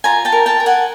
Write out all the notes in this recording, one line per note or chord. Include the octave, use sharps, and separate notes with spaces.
F4 G#5 A#5
G5 A5
A#4
G5 A5
A#4
F#5 G#5